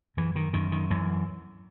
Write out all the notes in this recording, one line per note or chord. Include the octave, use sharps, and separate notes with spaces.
F#2 E3
D#3
F#2 D#3
D#3
F#2 E3